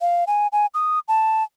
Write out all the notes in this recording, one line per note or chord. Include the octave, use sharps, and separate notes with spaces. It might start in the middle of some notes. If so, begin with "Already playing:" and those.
F5
G#5
G#5
D#6
A5